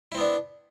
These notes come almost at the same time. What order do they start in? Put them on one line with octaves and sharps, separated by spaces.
E4 C4 B3 D4